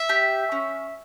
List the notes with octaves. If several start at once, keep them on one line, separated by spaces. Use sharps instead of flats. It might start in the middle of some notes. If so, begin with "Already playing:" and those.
Already playing: E5
G4
C#4